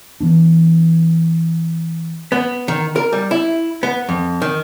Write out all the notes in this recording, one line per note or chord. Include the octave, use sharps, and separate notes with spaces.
E3 B3 D4
B3
D#3
A#4
G3
E4
B3
F2
D#3